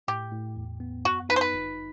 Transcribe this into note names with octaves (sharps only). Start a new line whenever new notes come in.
A2 G4
A2
E2
B3
F#2 F#4
D#4 B4
C5
B4
G1